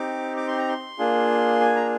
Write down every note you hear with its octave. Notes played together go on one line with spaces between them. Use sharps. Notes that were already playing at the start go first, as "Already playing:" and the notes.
Already playing: C4 D#4 G4 D6
D6
C6
A#5
C6
A#3 D4 F4 G#4
G#5
A#5